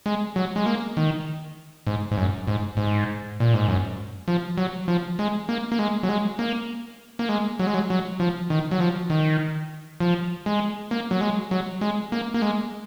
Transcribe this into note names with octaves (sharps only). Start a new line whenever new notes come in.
G#3
F#3
G#3
A#3
D#3
G#2
G#2
F#2
G#2
G#2
A#2
G#2
F#2
F3
F#3
F3
G#3
A#3
A#3
G#3
F#3
G#3
A#3
A#3
G#3
F#3
G#3
F#3
F#3
F3
D#3
F#3
F3
D#3
F3
G#3
A#3
F#3
G#3
F#3
G#3
A#3
A#3
G#3